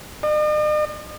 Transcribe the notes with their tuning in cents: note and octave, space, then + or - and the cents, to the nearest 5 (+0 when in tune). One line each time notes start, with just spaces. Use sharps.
D#5 -45